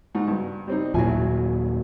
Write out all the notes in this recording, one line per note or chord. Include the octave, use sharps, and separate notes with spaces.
G#2 D#4 F#4
G2
G3 C4 D#4
D#2 A#2 F3 F#3 E4 G#5